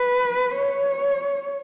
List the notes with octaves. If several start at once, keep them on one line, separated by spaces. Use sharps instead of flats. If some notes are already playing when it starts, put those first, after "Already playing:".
Already playing: B4
C#5